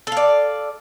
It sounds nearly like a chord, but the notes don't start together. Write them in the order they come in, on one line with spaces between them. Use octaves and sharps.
A4 F5 D5